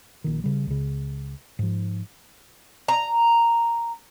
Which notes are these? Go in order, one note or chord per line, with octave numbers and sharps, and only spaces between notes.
A#1 D#3
C#3 G3
C#2 C#3
G#2 F3
A#5